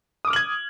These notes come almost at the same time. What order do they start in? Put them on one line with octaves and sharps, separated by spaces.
D#6 D6 F6 F#7 G#6